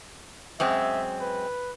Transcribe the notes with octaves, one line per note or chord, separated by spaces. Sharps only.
F#2 G#3 C4 E5
B4